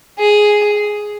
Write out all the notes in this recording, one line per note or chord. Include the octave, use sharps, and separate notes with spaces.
G#4